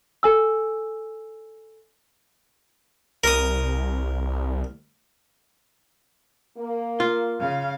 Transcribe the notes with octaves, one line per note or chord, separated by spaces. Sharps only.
A4 G#5 E6
C2 A#4 D#6
A#3
F4
C#3 F5